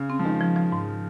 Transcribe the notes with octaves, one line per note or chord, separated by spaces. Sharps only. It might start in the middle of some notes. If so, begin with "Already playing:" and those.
Already playing: C#3
C4
F3
D#3 G#3
F3
F3
G#2